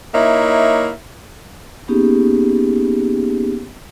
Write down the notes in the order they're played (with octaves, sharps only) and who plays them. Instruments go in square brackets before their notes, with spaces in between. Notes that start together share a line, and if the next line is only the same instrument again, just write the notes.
[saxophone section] A#3 D#4 E4 C#5 E5
[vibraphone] A#3 B3 C#4 D#4 G4 G#4